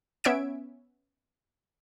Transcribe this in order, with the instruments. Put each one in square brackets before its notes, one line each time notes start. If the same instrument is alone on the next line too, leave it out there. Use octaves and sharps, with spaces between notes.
[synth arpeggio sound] B3 C#4 E5 G#6 D7